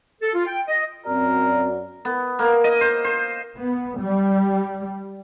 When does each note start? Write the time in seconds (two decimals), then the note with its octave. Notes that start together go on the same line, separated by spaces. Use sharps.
0.21 A4
0.34 F4
0.46 G5
0.68 D#5
1.06 F#2 C4 F#4 A#4 D5
2.05 B3
2.39 A#3
2.64 D#5
2.81 C5
3.04 C5
3.59 B3
4.01 G3